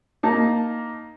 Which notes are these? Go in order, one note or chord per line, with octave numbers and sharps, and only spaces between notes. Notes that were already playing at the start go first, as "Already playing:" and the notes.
A#3 D#4 A5